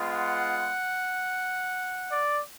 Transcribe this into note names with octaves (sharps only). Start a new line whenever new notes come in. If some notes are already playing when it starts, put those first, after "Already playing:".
Already playing: G#3 B3 F4
F#5
D5